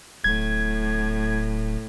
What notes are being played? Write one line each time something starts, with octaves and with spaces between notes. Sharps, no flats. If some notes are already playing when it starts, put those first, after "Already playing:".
D1 A2 G#6